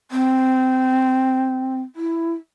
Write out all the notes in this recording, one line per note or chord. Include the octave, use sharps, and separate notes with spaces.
C4
E4